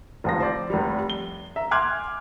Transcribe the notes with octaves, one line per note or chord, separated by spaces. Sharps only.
F1 F3 A#6
C5 D5
F1 G3
G7
E5 A#5
G#5 C6 D6 F6 F#6 G#6